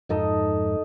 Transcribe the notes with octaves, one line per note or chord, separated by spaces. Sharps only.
F2 G#2 D#4 A4 D#5